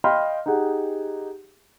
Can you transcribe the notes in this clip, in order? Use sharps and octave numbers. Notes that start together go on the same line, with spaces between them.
D#5 F5 G5 B5 C6 F6
D#4 G4 G#4 F#5